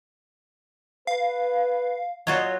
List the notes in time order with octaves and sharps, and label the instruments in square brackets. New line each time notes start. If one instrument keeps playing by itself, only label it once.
[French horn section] B4 [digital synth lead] F5
[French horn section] A#2 D#5 [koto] F#3 F4 F#4 [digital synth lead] C#5